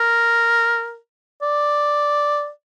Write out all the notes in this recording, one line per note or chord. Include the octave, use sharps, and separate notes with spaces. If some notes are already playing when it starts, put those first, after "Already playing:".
Already playing: A#4
D5